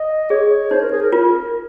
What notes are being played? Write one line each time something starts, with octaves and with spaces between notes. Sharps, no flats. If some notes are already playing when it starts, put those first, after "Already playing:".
Already playing: D#5
G#4 C#5
D#4 C5
A#4
G#4
A#4
F4 A#4